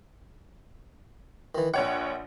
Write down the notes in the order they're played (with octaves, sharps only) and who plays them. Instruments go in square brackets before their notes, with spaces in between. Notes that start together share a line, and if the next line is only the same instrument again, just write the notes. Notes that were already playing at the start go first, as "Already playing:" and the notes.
[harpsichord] D#3 E3
[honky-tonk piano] A#1 C#5 F#5 [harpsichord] G5